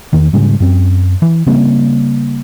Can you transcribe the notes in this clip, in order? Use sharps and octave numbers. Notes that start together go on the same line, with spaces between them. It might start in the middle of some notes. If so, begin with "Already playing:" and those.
E2 D#3
G#2 C#3 G3 G#3
F#2 C4
E3
C#3 G3 A#3 C4